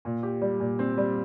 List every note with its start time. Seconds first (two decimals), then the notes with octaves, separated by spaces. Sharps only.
0.05 A#2
0.23 G4
0.42 G3
0.60 A#2
0.79 C4
0.98 G3